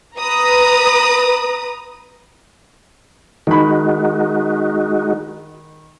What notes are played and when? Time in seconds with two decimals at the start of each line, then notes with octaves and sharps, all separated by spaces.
0.18 B4 A#5 D#6
3.47 D#3 G#3 D#4 F#4 B5